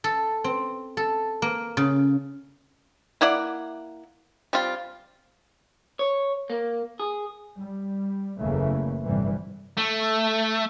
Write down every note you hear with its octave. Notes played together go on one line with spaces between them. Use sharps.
A4
C4
A4
A#3
C#3
A#3 E4 D5 F#5
G3 C4 F4
C#5
A#3
G#4
G3
F#1 E2 C#3 E3 A3 A#3
G1 E2 A2 C3 E3 G3
A3